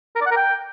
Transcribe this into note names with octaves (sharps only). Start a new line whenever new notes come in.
A#4
D5
F#5
A#4
G5